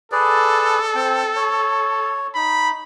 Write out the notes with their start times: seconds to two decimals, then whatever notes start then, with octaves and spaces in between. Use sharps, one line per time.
0.12 G#4 A4 B4 D5
0.95 C4 G5
1.36 C#5
2.36 D#4 B5